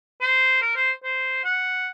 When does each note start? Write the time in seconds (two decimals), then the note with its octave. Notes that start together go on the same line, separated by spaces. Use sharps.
0.21 C5
0.62 A#4
0.76 C5
1.04 C5
1.45 F#5